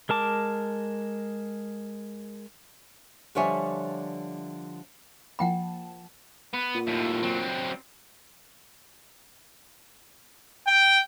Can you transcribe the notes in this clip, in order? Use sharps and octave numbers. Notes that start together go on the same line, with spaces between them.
G#3 A#4 A5 D6
D3 F3 G3 C#5 E5 G#5
F3 A#3 F#5 G5 A5 B5
B3
A#2
D#2 A2
F#3 C4
G5